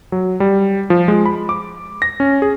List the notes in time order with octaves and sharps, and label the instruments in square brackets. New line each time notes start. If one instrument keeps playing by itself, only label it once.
[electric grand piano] F#3
G3
F3
G#3
B5
D6
A#6
C#4
G#4